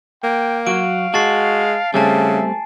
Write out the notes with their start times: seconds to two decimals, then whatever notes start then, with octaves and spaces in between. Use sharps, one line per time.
0.23 A#3 G5
0.67 F#3 F#4 F5 D7
1.14 G#3 F#4 A5 A6 C7
1.94 C#3 G3 A3 C4 E5 G#5 A5